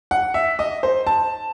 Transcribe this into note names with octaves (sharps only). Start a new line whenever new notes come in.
F#5
E5
D#5
C5
A5